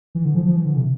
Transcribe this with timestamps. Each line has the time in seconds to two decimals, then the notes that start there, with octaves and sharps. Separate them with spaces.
0.15 E3
0.25 D3
0.35 F3
0.45 F3
0.56 E3
0.65 D3
0.76 C3